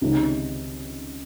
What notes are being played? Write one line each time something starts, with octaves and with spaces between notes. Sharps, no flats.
C#2 C3 D#3 G#3 C#4